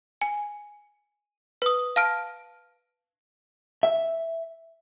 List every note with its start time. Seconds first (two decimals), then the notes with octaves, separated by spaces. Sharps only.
0.21 G#5
1.62 B4 D#6
1.96 F5 A5 F6 D7
3.83 E5